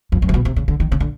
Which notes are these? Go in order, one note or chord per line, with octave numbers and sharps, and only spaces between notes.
F2
F#2
C3
B2
C3
C#3
D3
D#3
C#3
D3